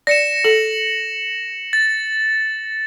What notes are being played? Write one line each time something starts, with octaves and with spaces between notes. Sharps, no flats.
D5 A#6 C#7 E7
A4 F#7
A6